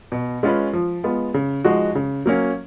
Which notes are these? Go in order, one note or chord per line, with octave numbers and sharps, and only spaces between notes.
B2
G#3 C#4 F4 B4
F3
G#3 B3 F4
C#3
F3 G#3 D#4 F#4
C#3
F#3 A#3 C#4